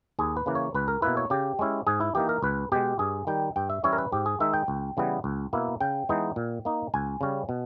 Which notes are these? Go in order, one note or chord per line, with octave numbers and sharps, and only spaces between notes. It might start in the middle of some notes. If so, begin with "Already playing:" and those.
D#2 G#4
B4
C#3 E3 A#3
C#5
C#2 B4
A#4
B2 A#3 E4 B4
C#5
C#3 G4
G#3 C#4 E4
G#2 G#4
E4
E3 A#3 D#4 G4
A#4
C#2 B4
B2 G#3 G4
G2 G#4
D#3 G3 G5
G2 G5
E5
E3 G3 C#4 E4 C#5
A#4
B4
G#2 G4
G#4
D#3 G#3 D#4 E5
G5
C#2
C#3 E3 G3 B3
C#2
B2 A#3 E4
C#3 G5
E3 G#3 B3 D#4
A#2
A#3 D#4
C#2 G#5
C#3 G3 C#4
B2